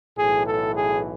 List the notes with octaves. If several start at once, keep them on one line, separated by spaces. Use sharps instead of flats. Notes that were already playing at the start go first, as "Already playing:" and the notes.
B1 A2 E3 G#4
A4
G#4